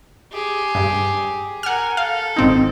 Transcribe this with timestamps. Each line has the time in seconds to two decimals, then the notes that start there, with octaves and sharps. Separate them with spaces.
0.32 G4 G#4
0.75 G2
1.63 A#4 F#5 G#5 F6
1.97 A4 F5
2.36 G#1 C4 D#4